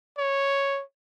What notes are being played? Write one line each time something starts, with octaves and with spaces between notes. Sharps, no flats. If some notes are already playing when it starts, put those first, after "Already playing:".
C#5